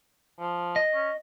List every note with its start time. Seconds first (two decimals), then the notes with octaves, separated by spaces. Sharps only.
0.40 F3
0.76 D#5
0.94 C#4